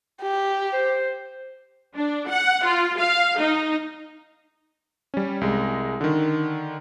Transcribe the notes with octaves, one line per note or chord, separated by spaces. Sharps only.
G4
C5
D4
F#5
F4
F5
D#4
G3 C#4
C2 G#3
D3 D#3